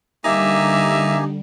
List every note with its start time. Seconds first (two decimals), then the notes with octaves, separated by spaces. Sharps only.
0.24 D3 G3 A#3 D#4 G4 E5 G#5